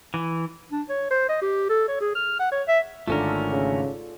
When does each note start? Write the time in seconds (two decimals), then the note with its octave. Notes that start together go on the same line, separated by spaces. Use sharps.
0.14 E3
0.72 D4
0.89 C#5
1.11 C5
1.29 D#5
1.42 G4
1.69 A4
1.88 C#5
2.01 G#4
2.15 F6
2.40 F#5
2.52 C#5
2.68 E5
3.08 G#1 D3 A3 C#4 F4 A4 A#4 D5
3.51 C#3